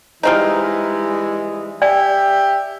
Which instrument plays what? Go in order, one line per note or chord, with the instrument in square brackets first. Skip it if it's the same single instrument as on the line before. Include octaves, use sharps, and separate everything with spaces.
[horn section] E3 G3 G#3 [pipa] F3 C4 D#4
[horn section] G4 E5 G5 [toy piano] D5 G#5